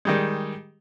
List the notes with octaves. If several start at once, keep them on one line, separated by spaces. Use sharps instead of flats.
D#3 G3 G#3